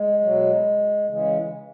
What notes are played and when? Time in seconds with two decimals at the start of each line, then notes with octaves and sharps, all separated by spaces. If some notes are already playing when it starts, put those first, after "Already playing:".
Already playing: G#3
0.21 B2 F#3
1.07 C#3 E3 G#3